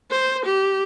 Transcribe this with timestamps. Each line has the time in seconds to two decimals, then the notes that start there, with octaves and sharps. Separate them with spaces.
0.11 C5
0.46 G4